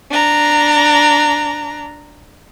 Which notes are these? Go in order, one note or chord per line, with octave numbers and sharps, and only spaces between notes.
D4 A#5